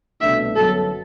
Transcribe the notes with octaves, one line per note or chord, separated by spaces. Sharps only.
C2 B2 A3 D4 E5
G1 F#2 F#3 B3 A4